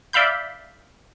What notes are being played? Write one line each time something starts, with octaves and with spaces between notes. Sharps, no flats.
D5 E5 F5 B5 G6